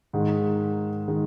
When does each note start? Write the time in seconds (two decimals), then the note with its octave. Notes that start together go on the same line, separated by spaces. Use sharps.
0.13 G#2 D#3 G#3
1.08 D#3 G#3